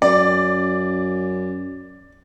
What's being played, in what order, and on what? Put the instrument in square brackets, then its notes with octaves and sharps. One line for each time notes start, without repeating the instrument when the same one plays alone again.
[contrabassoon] F#2 [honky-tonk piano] D5